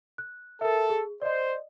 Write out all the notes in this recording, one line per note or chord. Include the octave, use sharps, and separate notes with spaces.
F#6
A4 A#4 E5
G#4
C5 D5 D#5